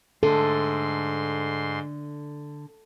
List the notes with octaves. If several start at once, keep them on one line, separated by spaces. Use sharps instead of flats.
G#2 D3 A4 C6